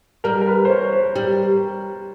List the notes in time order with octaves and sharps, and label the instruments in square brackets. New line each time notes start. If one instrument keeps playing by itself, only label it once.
[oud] G3 [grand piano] A#4
[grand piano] A#4
B4
C5
C#5
C5
[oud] G3